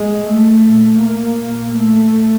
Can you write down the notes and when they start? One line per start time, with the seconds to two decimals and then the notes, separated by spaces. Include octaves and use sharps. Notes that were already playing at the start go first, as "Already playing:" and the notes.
Already playing: G#3
0.30 A3
0.66 A#2
1.04 A#3
1.41 A#2
1.77 A3